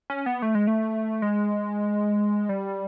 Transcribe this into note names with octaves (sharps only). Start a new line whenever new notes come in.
C#4
B3
A3
G#3
A3
G#3
G3